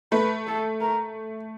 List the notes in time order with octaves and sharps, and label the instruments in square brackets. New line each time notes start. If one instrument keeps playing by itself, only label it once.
[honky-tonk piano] A3 [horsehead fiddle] B4
[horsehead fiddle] A4
A#4